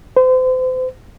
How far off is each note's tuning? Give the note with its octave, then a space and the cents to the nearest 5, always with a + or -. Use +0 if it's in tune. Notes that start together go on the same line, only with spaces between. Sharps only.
C5 -35